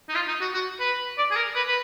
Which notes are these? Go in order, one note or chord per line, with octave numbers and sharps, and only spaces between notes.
D#4
F4
D#4
F#4
F#4
B4
D5
G#4
A#4
B4
B4